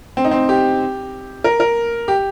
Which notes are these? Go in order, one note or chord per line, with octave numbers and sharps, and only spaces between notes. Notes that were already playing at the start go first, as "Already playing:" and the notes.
C4
D#4
C4
G4
A#4
A#4
G4